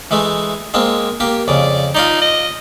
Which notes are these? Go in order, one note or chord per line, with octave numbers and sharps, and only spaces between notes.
E3 G#3 A3
G#3 A#3 C4
A#3 G4
F2 C#3 D5
D#4 F4 D5 D#6
D#5